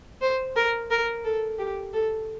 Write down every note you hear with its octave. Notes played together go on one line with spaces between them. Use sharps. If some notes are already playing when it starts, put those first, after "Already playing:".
C5
A#4
A#4
A4
G4
A4